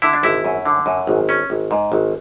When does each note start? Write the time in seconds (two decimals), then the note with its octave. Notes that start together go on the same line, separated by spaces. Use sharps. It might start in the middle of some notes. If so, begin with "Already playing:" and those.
0.02 D3 E4
0.13 D4
0.23 G#1 E4
0.44 F#2
0.66 D3
0.86 F#2
1.07 G#1
1.29 C#4
1.50 G#1
1.71 G#2
1.92 G#1